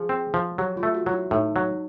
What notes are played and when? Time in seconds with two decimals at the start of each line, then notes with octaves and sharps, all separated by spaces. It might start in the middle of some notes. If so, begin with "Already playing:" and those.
Already playing: F3 G#4
0.09 C4
0.34 F3
0.58 F#3 G4
0.77 F4
0.83 A3
0.94 F#4
1.06 F#3
1.13 E4
1.31 A2 D#4
1.56 F#3